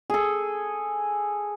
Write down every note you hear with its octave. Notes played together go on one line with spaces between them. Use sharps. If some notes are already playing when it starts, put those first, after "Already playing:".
G#4 A4